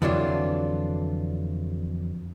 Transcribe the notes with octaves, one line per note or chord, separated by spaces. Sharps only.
F2 D3 E3 F#3 D4 F4